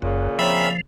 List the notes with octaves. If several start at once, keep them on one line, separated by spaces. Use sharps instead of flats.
F#1 F#2 A#2 C#3
F3 C4 C#4 A#4 E5 B5